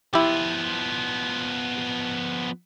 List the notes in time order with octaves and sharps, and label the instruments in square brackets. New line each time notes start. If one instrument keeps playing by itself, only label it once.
[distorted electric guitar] F3 B3 [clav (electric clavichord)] E4 G4